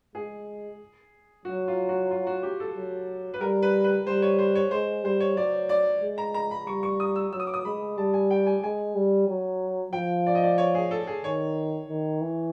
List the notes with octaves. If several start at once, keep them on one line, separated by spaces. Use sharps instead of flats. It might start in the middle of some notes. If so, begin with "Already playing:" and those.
G#3 G#4
F#3 F#4
F4
F#4
F4
F#4
G4
A4
F#3
B4
G3 A#4
B4
B4
G3 C5
C#5
C5
C#5
G#3 C5
G3 C5
C#5
F#3 D5
D5
G#3
A#5
A#5
B5
G3 C#6
C#6
D#6
E6
F#3 E6
D#6
D6
D#6
G#3 B5
G3 A5
G#5
G5
G#5
G#3 G#5
G3
F#3
F3 G5
D5
D#5
D5
C#5
G#4
A4
G#4
D#3 C#5
D#3
E3